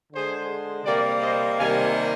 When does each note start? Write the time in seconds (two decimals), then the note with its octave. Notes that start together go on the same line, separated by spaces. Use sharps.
0.12 D3 G#3 G#4 C5
0.84 C3 G3 A#3 A#4 D5
1.21 C5 D#5
1.57 C3 D#3 G3 A#3 F5 G#5